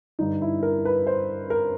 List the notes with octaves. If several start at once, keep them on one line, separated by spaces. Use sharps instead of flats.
G2 D3 D#4
E4
A#4
B4
C5
A#4